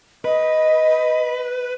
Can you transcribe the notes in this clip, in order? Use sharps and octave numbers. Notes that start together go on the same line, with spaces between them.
B4 D#5